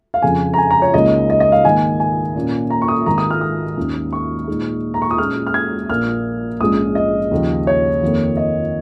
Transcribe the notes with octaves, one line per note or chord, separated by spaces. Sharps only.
F5
F2 C#3 F3 G#5
A#5
G#5
A#5
C#5
C#2 C#3 A#3 D#4 D#5
D#5
D#5
F5
G#2 D#3 A#3 G#5
G#5
A#2 A#3 C#4
A#5
C#6
D#6
G#1 G#2 D#3 A#3 A#5
D#6
F6
D#6
D#2 D#3 C#4
C#6
A#2 G#3 D#4
A#5
C#6
D#6
A#2 G#3 C#4 F6
F6
G#6
A#1 A#2 A#3 F6
A#1 G#2 G#3 C#4 D#6
D#5
D#2 C#3 F3
C#5
F2 D#3 A#3
D#5